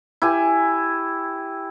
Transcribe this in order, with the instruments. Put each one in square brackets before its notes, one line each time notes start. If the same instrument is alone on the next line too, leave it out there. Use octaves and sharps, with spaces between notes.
[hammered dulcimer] E4 G4 G#5